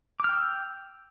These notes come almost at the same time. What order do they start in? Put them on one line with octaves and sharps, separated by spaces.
D6 F6 G5 E6